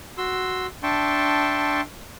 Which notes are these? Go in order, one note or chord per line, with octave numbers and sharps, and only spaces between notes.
F#4 C6 E6
D4 E5 G5 A5 C6 C#6